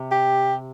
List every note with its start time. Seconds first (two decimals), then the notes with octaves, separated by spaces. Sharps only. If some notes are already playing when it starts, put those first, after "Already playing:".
Already playing: C3
0.11 G4